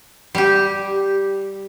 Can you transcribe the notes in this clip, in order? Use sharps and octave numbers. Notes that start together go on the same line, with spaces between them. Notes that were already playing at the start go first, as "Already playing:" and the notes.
G3 G4